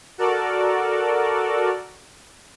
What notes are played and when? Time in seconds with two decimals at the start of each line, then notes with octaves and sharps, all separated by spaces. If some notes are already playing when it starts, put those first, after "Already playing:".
0.18 F#4 A4 A#4 D5